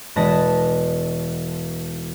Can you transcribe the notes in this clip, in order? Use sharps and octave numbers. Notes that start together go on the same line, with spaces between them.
E1 G#3 B4 G#5 A5 A#6